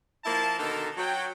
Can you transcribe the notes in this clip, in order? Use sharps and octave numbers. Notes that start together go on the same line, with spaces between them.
F3 A#3 E4 A5
B2 D3 D#3 D#4 A4 A#4
F#3 G5